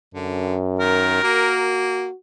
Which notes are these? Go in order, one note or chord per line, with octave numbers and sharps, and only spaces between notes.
F#2 D3
D#3 A#4
A#3 F#4